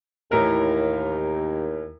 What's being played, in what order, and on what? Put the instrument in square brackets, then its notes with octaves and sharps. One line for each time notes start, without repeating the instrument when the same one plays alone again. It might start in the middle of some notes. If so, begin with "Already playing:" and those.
[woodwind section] D#2 [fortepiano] A2 E3 A#4